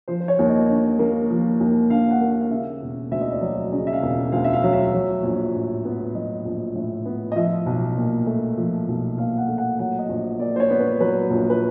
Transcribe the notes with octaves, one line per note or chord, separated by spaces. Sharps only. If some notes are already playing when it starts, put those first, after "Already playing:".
F3 C5
C5
C#5
D#2
D#5
D3
A#3
F3
D#2
D3 F5
F#5
A#3
F5
F5
C#3 E5
E1
D2 E5
D#5
D5
F#3 D#5
C#3 D#5
E5
F5
E1
D2 F5
E5
F5
F#3
E5
F#3
A#1
A2
B3
F#3 D#5
A#1
A2
B3
D#5
F3 E5
B1
A#2
A3
F3
B1
A#2 F5
F#5
A3
F#5
F#3 F#5
D#5
A#1
A#2 D5
C5
C#5
B3
B4
F#3 B4
A#1
B4